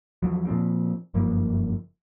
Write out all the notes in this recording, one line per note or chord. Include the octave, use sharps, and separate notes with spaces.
E2 F3 F#3
A#2 F3 C4
F#1 G2 F3 A#3